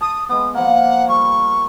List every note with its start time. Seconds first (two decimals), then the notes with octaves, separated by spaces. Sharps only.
0.01 A5 D#6
0.29 G#3 B3 D#6
0.55 F3 A#3 F#5
1.09 G3 C#6